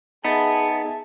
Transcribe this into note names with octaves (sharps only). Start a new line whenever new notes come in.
B3 D#4 G#4 E5 A5 A6